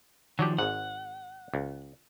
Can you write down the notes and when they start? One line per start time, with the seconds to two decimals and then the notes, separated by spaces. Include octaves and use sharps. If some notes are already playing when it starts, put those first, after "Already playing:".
0.39 D#3 F3 F#3 D4 G4
0.59 G#1 G#2 F#5
1.54 C#2